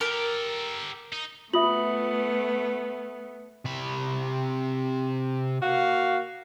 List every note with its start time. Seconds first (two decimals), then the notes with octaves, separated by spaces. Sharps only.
0.01 G4 A4 A#4
1.13 D#4
1.54 A3 B3 F4 E5 D#6 F#7
3.65 C3 B5
5.62 A#3 F#4 F5